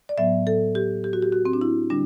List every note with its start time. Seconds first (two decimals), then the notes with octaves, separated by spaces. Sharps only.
0.09 D5
0.18 A2 F#3 B3 E5
0.47 A4
0.75 G4
1.04 G4
1.13 F#4
1.22 G4
1.33 F#4
1.45 C4
1.53 D4
1.61 E4
1.90 D3 G3 D4